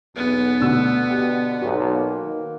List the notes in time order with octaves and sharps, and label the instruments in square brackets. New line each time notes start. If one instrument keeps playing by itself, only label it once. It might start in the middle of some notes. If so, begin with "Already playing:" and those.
[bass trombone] B1 [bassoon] E2 [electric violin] B3
[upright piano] D2 B2 E6 [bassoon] D3
[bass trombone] B2 [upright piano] G4
[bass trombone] B1 [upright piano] F#4
[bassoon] A#3
[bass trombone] D#3